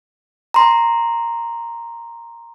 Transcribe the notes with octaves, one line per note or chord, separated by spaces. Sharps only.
A#5 C6